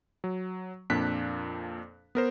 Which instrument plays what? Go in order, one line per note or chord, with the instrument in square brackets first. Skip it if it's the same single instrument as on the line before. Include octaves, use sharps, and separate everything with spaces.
[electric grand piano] F#3
F2 A#2 D4 F#6 B6
B3 A#4 C5